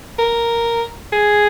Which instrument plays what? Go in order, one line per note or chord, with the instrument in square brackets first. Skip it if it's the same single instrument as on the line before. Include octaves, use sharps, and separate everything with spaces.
[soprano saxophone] A#4
G#4